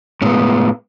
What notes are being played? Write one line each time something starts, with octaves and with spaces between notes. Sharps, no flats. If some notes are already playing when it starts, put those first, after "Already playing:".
A2 G#3 B3 C#4